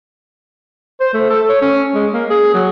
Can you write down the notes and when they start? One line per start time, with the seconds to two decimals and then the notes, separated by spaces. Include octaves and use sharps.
1.01 C5
1.14 A3
1.30 A4
1.49 C#5
1.62 C#4
1.95 G#3
2.13 A#3
2.30 G#4
2.54 F#3